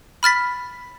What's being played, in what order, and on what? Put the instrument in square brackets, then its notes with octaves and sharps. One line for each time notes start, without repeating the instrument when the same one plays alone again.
[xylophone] B5 F6 A6 B6